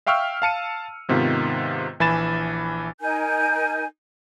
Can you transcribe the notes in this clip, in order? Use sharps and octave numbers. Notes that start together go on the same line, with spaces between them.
E5 F5 G5 C#6 E6 F6
F5 A5 C#7 D#7
G#2 C3 D#3 B3 F4
A#1 E3 G#5 B5 A6 E7
D#4 A#4 G#5 G6